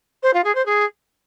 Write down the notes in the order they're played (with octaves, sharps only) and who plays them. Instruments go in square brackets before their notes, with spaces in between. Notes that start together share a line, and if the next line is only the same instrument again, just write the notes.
[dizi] C5
F4
G#4
C5
G#4